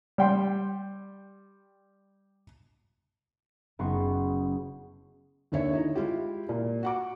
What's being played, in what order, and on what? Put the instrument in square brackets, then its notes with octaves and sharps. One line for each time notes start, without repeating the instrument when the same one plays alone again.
[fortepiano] G3 G5 C6
[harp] F#1 B3 D#4 F#5 C6 C#6
[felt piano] D#2 D3 C#5 E5
D#4 E4
G#3 E4 F4 G4
A#2
F#4 F#5 D6